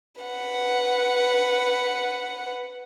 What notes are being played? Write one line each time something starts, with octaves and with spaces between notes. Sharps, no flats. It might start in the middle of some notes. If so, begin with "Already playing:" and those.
B4 F#5